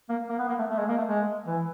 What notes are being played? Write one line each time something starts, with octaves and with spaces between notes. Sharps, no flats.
A#3
A#3
B3
A#3
A3
A3
G#3
A#3
A3
G#3
E3